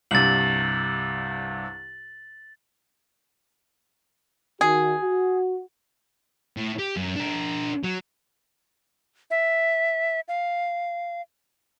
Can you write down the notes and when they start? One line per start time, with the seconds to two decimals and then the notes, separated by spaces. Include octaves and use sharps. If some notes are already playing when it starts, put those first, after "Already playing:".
0.11 C2 G2 C3 A6 F#7
4.61 D#3 F#4 G#4
5.00 F#4
6.57 A2
6.79 G4
6.96 F#2
7.16 D4 A#4
7.84 F#3
9.31 E5
10.28 F5